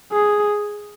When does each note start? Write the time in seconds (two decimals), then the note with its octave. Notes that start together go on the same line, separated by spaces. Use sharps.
0.12 G#4